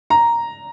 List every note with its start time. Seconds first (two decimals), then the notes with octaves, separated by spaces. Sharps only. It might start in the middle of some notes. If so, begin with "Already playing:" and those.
0.10 A#5